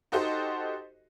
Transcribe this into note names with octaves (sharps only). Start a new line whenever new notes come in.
D#4 F#4 G4 A4 C5 D#5